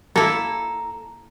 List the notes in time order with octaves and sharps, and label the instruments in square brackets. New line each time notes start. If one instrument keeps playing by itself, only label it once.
[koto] A#3 E4 [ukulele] A4 [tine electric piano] A#5